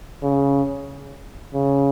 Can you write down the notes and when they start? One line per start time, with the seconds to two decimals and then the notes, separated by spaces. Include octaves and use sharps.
0.23 C#3
1.54 C#3